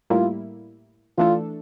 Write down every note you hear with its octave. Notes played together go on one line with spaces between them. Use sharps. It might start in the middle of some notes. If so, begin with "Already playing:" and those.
A2 G3 A#3 E4 F4
E3 A3 D4 F4 A4